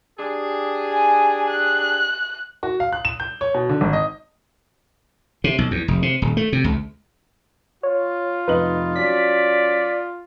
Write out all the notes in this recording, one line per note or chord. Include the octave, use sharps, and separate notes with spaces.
D4 G4 G#4
G#5
F#6
F#4
F5
F#6
E7
G6
C#5
B2
D3
G#1
D#5
C3
B1
E2
F1
C3
D#1
A3
C3
C#2
F4 C#5
F1 D#4 B4 F#7
F#3 C#4 D5 B6